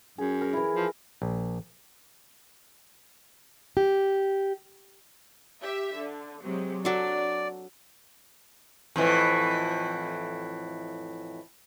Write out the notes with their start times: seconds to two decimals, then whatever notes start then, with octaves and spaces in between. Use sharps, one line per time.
0.18 F#2 G#4
0.41 A#4
0.53 E3 E4
0.75 F3
1.22 A#1
3.77 G4
5.61 G4 E5
5.96 D3
6.42 C3 F#3 G#3
6.85 F#3 D4 A4 D5
8.96 F2 A2 E3